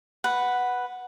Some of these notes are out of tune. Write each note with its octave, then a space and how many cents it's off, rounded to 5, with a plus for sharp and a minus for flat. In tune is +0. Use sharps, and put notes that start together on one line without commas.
B4 +0 F#5 +0